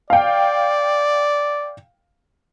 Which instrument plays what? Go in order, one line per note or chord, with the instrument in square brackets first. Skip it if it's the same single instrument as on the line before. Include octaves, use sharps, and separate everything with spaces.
[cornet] D5 [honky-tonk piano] F5 G5